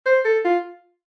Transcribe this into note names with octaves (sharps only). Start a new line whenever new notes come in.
C5
A4
F4